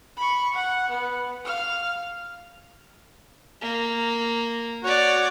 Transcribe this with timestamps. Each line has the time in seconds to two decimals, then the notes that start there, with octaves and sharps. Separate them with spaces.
0.17 B5 C#6
0.54 F#5
0.90 B3
1.45 F5 F6
3.62 A#3
4.84 F#4 C#5 D5